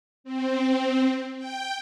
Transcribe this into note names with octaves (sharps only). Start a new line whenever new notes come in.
C4
G5